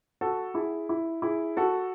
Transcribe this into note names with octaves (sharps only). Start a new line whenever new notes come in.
F#4 A4
E4 G#4
E4
E4 G#4
F#4 A4